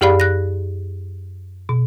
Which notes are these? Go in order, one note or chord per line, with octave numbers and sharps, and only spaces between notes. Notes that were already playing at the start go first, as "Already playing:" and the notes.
F#2 G4 G#4 D5 F5 B5
F#6 A#6
B2